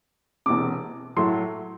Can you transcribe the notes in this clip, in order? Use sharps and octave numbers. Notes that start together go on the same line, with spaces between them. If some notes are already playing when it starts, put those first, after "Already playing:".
E1 E2 C3 D6
A2 F#3 A3 E4 C6